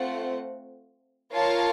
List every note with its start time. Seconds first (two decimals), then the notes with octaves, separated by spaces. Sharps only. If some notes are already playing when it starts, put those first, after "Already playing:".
Already playing: A3 C4 F4 C5 F#5
1.32 F4 A#4 C#5 F5 A5